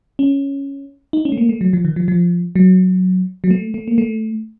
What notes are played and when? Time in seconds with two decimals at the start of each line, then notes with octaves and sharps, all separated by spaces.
0.19 C#4
1.13 D#4
1.25 C#4
1.32 A3
1.38 A#3
1.49 A3
1.61 F#3
1.73 F3
1.85 D#3
1.96 F3
2.08 F3
2.55 F#3
3.44 F#3
3.50 A3
3.74 A3
3.88 A#3
3.98 A3